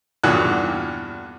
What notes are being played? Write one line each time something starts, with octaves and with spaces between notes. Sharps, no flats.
E2 G2 A#2 F#4 F#6